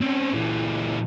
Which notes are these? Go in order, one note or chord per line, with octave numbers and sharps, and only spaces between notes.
C4 C#4
A#2 E3